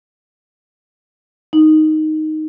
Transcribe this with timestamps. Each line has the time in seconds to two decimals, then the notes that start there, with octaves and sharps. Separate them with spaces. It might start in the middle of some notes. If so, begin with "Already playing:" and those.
1.53 D#4